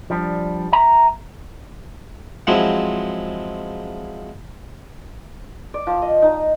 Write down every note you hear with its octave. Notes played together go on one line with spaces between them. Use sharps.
F3 G3 D4
E5 A#5
F3 F#3 G#3 C4 E4
D5
F3
D#5
D#4